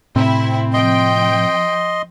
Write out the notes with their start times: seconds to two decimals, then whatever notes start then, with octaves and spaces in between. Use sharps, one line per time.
0.16 A2 C3 C4 E4
0.73 F3 D#5 G5 C6